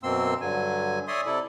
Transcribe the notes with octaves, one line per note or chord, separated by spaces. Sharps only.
F#2 B2 A#3 C4 C6 E6
G2 D3 F#3 G#5
C#5 D5 E5 G#5 C6 D#6
C3 E4 A4 D5